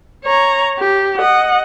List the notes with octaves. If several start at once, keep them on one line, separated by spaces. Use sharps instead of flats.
C#5 A#5
G4
D#5 F#5